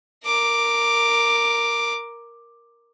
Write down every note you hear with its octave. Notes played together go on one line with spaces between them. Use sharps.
A#4 D6